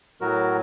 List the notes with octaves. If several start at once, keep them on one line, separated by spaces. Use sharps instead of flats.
A2 F#3 F#4 A#4